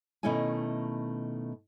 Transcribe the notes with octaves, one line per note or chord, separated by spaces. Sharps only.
B2 D#3 A3 C#4 E4 G#5